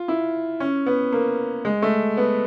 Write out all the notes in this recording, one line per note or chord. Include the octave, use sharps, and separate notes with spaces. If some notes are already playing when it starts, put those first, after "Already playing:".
Already playing: F4
E4
C#4
B3
A#3
G#3
A3
B3